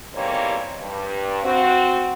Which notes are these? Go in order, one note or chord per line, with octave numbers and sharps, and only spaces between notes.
E2 G#2 G3 A#3 C4 C#5
G2
C4 F#4